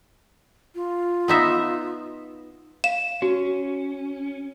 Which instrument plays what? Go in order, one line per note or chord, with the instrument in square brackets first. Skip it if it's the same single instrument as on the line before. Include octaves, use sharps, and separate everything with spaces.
[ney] F4
[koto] B3 D#4 E5
[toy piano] F5 [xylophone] E7
[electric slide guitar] C#4 [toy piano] F#4